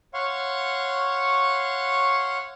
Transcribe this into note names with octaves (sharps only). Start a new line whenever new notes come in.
C#5 F5 F#5 C6 C#6